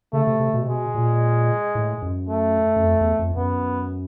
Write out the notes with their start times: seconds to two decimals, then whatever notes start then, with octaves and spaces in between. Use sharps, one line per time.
0.13 C#3 A3
0.27 C3
0.40 C3
0.54 B2
0.62 C3
0.67 B2 G#3
0.95 A#2
1.75 A2
2.02 F#2
2.29 A3
2.76 F#2
2.83 F2
3.01 E2
3.19 F2
3.36 F#2 B3